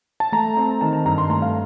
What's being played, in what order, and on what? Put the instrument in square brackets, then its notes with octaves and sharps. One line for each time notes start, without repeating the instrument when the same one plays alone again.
[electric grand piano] A5
[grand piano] A3 [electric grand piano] A#5
[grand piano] C4
[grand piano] D#3 [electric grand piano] A5
[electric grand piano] A#5
[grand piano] G2 [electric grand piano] A#5
[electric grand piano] C6
[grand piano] A3 [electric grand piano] A#5
[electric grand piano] F5